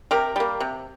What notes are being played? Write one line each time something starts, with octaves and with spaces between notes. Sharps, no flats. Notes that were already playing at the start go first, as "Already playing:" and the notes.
C3 G4 A#4
G3 A#3
C3